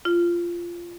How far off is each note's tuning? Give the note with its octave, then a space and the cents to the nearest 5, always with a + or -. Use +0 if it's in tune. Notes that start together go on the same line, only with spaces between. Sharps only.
F4 -15